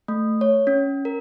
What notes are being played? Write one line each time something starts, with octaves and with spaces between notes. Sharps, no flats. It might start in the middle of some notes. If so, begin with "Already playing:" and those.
A3
C#5
C#4
A#4